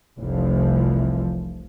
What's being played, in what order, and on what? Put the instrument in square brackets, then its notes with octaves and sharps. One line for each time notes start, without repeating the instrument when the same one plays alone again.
[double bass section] F1 C2 E3 F3